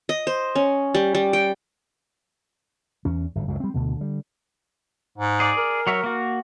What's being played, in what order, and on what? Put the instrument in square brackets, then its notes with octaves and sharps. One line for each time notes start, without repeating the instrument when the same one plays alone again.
[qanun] D#5
C5
C#4
G3
G3
G5
[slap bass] E2 C#4
G1 F#2 A2
C#2 F#2 C#3
G3 C4
D2 B2 D3
D3 G3
[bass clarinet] G#2
[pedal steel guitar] G#4 D5
[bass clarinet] A#4
[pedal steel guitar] F#3 C#5 E5
A#3 F#4